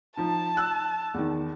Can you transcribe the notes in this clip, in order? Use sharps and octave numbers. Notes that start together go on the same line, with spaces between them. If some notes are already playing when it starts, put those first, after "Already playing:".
F3 D#4 A5
E6 F#6
E2 D#3